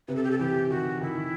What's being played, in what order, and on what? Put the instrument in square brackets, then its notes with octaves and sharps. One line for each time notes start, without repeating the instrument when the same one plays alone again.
[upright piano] C3 [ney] B4
[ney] A4
G4
A4
[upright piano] E3 [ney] G4
[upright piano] D#3 [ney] F#4
[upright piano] D#3 [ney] E4